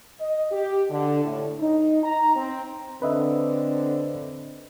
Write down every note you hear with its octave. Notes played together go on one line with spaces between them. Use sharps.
D#5
G4
D3
A2
D#4
A#5
C4
D3 C4 B4 D#5 E5